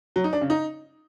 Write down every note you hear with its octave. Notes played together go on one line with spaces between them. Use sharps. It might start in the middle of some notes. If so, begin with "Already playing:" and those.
F#3
D#4
D4
C#3
D#4